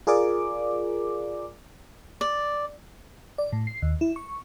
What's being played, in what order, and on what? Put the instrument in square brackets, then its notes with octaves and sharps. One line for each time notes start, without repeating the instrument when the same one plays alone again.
[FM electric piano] F4 G#4 A#4 D5 D6
[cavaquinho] D5
[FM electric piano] D5
A2
C7
D#2
E4
C#6